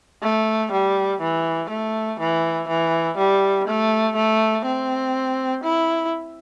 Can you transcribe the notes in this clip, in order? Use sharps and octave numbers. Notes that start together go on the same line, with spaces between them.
A3
G3
E3
A3
E3
E3
G3
A3
A3
C4
E4